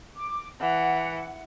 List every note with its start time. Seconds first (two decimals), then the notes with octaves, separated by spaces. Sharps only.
0.15 D6
0.60 E3 F#5